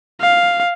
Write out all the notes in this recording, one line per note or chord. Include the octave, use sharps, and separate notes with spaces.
F5